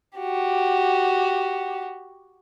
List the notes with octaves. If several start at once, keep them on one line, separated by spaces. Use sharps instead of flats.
F#4 G4